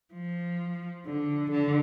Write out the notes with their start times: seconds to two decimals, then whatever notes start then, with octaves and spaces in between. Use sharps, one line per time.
0.14 F3
1.06 D3
1.50 D3